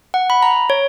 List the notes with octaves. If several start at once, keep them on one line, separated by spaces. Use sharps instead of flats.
F#5
B5
A#5
C#5